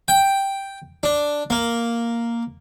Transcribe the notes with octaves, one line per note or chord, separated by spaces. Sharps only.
G5
D4
A#3